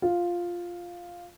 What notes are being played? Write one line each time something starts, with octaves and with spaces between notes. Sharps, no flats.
F4